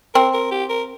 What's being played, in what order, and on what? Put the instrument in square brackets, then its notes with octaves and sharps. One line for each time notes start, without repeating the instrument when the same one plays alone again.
[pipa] C4 [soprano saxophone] A#4
[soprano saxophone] A#4
G4
A#4